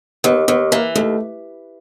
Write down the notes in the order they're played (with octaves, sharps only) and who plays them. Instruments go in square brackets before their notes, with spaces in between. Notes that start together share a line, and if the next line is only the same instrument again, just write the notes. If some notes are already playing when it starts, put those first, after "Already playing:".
[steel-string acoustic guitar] D#2 [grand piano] B3
[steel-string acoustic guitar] D#2 [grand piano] B3
[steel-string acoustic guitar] E3 [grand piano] A#3
[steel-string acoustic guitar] D#2 [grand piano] A3